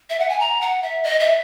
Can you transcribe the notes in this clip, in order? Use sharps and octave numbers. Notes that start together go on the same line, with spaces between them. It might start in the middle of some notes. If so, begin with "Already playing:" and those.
E5
F#5
G#5
A#5
F#5
E5
D#5
E5